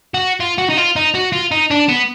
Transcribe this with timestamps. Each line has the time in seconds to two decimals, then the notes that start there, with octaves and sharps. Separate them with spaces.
0.14 F#4
0.40 F4
0.58 F#4
0.70 D#4
0.77 F4
0.96 D#4
1.15 F#4
1.32 F4
1.51 D#4
1.71 D4
1.89 B3